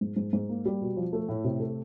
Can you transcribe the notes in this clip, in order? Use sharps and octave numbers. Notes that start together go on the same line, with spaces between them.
G#2
G#2
G#2
A#3
G3
B2
F3
A3
A2
C3
A3